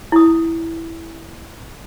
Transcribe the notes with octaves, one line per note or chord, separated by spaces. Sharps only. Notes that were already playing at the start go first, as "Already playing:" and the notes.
E4 D#6